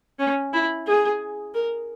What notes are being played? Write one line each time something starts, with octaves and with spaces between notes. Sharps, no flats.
C#4
E4
G#4
A#4